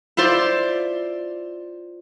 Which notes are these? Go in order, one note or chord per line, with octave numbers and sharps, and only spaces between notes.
E4 F4 C5 D5